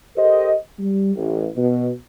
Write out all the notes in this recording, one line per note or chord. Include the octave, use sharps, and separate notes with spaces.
G4 A4 A#4 C5 D#5
G3
A1
B2